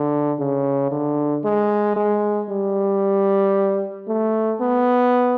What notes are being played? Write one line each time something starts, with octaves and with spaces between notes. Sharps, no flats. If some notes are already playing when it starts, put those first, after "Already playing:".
Already playing: D3
C#3
D3
G#3
G#3
G3
A3
B3